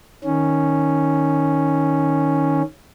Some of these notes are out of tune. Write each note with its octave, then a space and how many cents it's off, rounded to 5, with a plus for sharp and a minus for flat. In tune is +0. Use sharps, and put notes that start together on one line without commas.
D#3 +0 C#4 +0